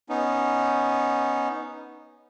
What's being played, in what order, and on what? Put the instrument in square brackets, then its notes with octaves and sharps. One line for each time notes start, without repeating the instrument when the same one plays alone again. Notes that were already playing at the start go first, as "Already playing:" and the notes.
[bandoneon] B3 C#4 D#4